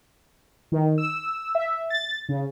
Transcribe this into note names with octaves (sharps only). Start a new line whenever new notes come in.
D#3
E6
E5
A6
C#3